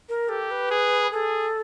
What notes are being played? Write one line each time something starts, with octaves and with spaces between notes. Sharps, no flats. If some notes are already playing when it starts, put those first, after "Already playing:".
A#4
G4 A4
B4
G#4
G#4 A4